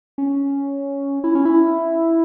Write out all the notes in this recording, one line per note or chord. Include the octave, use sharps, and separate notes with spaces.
C#4
E4
C#4
E4